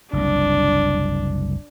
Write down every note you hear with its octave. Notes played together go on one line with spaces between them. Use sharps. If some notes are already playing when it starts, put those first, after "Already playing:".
F#1 C2 D4